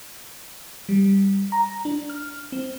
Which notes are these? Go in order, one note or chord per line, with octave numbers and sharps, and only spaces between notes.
G3
A#5
D4
F6
C4